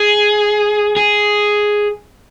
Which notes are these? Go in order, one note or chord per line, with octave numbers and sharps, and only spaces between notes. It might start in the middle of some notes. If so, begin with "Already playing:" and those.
Already playing: G#4
G#4